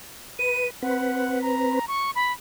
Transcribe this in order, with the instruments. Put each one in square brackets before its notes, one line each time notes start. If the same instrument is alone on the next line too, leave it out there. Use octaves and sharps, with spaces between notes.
[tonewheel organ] B4 [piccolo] D#7
[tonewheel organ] C4 B4 [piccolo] F#5
[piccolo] A#5
C#6
B5